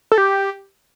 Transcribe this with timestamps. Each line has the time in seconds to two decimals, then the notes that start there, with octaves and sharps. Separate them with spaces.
0.12 A4
0.18 G4